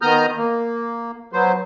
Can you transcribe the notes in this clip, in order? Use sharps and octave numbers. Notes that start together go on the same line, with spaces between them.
D#3 B3 A#5 D#6 F6 G6
A#3
F#3 B3 C5